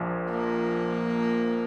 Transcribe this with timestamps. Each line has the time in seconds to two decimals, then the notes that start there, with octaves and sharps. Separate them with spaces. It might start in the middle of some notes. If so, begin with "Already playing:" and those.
Already playing: A#1 A#2 F3
0.30 A#3